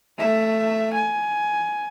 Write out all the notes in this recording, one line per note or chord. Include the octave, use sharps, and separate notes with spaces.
A3 E5
G#5